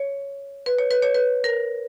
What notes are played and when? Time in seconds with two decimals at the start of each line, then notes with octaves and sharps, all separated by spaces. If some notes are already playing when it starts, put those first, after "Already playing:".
Already playing: C#5
0.66 B4
0.79 C#5
0.91 B4
1.03 C#5
1.14 B4
1.44 A#4